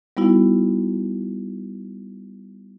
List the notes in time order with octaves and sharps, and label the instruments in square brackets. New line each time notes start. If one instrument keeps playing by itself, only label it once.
[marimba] G3 B3 D#4 E4 F#4